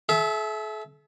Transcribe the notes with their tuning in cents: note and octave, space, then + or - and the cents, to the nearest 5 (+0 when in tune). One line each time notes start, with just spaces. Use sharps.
A4 -45 E5 +0